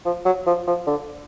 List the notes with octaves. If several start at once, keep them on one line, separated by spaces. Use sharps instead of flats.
F3
F#3
F3
F3
D3